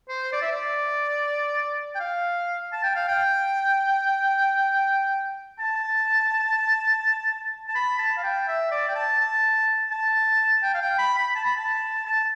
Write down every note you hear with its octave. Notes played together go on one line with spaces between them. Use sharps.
C5
D5
E5
D5
G5
F5
A5
G5
F5
G5
A5
A5
B5
A5
F5
G5
E5
D5
G5
A5
A5
A5
G5
F5
G5
B5
B5
A5
B5
A5
A5